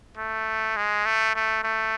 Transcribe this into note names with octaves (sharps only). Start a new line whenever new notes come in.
A3
G#3
A3
A3
A3